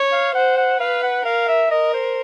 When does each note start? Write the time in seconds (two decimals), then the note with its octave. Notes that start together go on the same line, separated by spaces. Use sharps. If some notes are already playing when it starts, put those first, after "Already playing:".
Already playing: C#5
0.12 F5
0.35 C5 F#5
0.57 F#5
0.80 B4 F5
1.03 F#5
1.25 A#4 F5
1.48 E5
1.71 A#4 D#5
1.94 C5